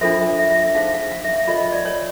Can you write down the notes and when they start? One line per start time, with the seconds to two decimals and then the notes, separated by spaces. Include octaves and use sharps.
0.01 D4 F4 A4 C5 E5
0.21 E5
0.39 E5
0.50 E5
0.63 E5
0.75 D#4 G#4 C5 F5
0.94 F5
1.12 F5
1.24 E5
1.36 E5
1.48 F4 A4 C#5 D#5
1.60 D#5
1.72 D5
1.85 C#5